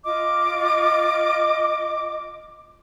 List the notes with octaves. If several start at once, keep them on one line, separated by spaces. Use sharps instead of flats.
F4 D#5 D6